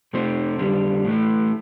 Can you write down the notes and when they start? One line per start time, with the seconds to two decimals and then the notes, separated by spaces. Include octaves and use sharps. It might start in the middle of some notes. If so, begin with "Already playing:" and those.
0.13 F2 C3 F3 A3 C4
0.59 F2 D3 G3
1.05 A2 E3 A3